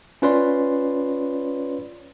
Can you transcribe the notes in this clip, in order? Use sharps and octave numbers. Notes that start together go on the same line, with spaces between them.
C#4 F4 B4 C#5 D5 C6